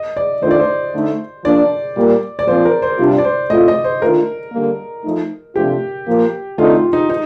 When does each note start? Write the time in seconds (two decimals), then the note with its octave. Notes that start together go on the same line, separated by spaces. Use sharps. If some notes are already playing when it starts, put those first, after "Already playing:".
Already playing: D#5
0.17 D5
0.42 D#3 A3 D4 F4 C5
0.51 D5
0.60 C5
0.94 D3 A3 D#4
1.45 F3 A#3 D4 D5
1.96 A#2 G3 A#3
2.39 D5
2.48 A#2 F3 C4 F4 C5
2.65 A#4
2.82 C5
2.99 C3 G3 D4 F4
3.18 D5
3.25 C5
3.50 A2 A3 C4 F4 D#5
3.68 D#5
3.84 C5
4.02 D#3 A3 D4 F4 A#4
4.52 D3 G3 A#3
5.05 F3 A3 D#4
5.55 C3 F3 A3 D4 F4 G4
6.07 A#2 F3 A#3
6.58 D3 A3 C4 D#4 F4
6.75 F4
6.93 D#4
7.10 D#4